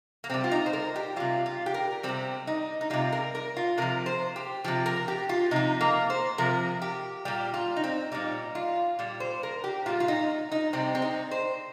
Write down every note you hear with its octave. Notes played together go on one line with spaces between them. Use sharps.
A#3
C3 G3 C4
F4
D#4
C5
A#4
G4
C3 G3 F4
F4
G4
A#4
C3 G3 C4
D#4
D#4
C3 G3 F4
A#4
A#4
F4
C3 F3 A#4
C5
G4
C3 F3 G4
A#4
G4
F4
C3 F3 D#4
A#3
C5
C3 F3 A#4
G4
A#2 G3 G4
F4
D#4
C4
A#2 G3 D#4
F4
A#2 G3
C5
A#4
G4
A#2 G3 F4
F4
D#4
D#4
C3 G3 C4
C4
D#4
C5